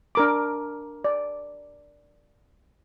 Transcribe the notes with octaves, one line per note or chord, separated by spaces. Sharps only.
D4 A#4 D6
D5